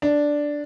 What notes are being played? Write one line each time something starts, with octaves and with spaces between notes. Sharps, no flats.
D4